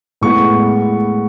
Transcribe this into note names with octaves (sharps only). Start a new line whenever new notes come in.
A2 G#3 B3 C#6